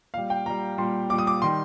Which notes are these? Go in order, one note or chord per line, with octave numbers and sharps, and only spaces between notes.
A#2 G3 F5
G5
A#2 G3 A#5
A#2 G3 C6
A#2 G3 D6
D#6
D6
D#3 G3 C6